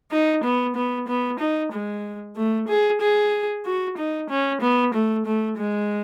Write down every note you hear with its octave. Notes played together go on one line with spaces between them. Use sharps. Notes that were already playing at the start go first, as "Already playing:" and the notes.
D#4
B3
B3
B3
D#4
G#3
A3
G#4
G#4
F#4
D#4
C#4
B3
A3
A3
G#3